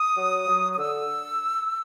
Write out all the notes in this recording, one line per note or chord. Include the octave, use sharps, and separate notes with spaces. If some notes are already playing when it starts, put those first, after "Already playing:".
Already playing: D#6
F#3
F#3
D#6
D3 E6